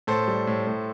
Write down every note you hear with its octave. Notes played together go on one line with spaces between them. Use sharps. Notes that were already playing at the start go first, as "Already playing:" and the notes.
A2 A4 C5
G3
A2
A2